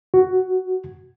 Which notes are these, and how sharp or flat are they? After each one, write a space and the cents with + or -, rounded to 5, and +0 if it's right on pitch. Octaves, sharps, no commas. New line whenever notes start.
F#4 +10